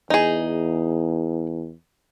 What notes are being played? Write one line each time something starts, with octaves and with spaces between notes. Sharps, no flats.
E2 D#4 G#4